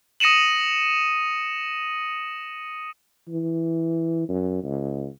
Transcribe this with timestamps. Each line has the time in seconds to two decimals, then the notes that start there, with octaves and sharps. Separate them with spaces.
0.20 D#6 A#6 C#7 D#7 E7 F#7
3.28 E3
4.29 F#2
4.63 C#2